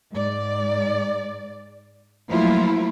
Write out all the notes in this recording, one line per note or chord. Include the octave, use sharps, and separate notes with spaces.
G#2 D5
F3 F#3 A3 A#3 E4 F4